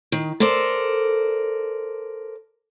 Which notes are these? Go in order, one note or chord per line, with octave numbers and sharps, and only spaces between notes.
D#3
A4 A#4 C5 D5